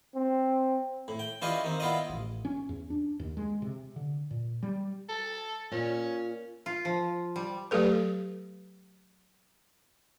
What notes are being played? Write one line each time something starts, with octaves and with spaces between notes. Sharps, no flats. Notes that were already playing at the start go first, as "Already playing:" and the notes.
C4
A2
G5
E3 C#4 F4 G4 D5 D#5
D#3 C4
B3 E4 F4 D5 D#5
A1
C#4
E2
D4
D#2
G#3
C3
D3
A#2
G3
A4
A#2 C#4
F4
F3
G3
F#3 A3 G4 A4 B4